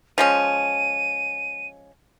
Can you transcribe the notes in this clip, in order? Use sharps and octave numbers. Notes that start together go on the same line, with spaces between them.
F3 G#3 C#4 D#7